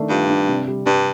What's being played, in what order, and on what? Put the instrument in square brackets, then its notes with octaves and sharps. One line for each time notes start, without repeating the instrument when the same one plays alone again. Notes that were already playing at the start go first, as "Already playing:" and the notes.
Already playing: [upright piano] D#3 A3 D4
[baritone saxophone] G2 [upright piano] F4
[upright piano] D4
C3
G3
[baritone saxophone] G2 [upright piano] D4